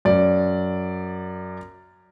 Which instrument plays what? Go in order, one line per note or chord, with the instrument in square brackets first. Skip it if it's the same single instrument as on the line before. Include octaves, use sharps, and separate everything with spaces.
[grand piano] F#2 D5